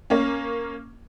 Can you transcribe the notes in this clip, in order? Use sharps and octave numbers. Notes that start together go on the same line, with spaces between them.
A#3 C#4